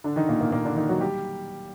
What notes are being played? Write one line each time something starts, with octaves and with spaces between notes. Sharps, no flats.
D3 D4
D#3 D#4
A#2 A#3
A#2 A#3
A#2 A#3
D3 D4
D#3 D#4
F#3 F#4
G3 G4